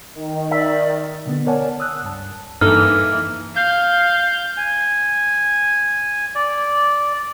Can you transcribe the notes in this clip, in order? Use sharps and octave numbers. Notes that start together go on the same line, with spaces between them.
D#3
D5 E5
B2 D3 B3
A#4 C#5 D5 F#5 G#5 A5
D#6 E6 F#6
C#2 G2 A5
G2 E3 A#3 D#4 A4 F6
F5 G6
G#5
D5